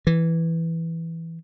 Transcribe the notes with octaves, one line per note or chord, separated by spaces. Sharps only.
E3